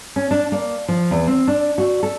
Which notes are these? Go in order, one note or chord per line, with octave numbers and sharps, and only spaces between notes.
C#4
D4
A#3
F3
E2
C4
D4
F#4
A4